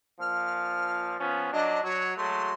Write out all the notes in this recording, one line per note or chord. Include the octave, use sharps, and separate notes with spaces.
A#2 F3 F6
F3 B3 C#4
F#3 D4 D#5
F#3 C#5
F#3 G#3 A3 C6